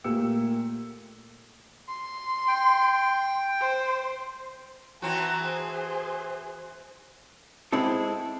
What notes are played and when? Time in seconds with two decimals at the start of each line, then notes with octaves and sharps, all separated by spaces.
0.04 A#2 A3 A#3 G4 E6 C#7
1.89 C6
2.47 G5
3.60 C5
5.02 E3 C4 F#4 A5 A#5
5.41 G#4 C5
7.72 G#3 C4 E4 A4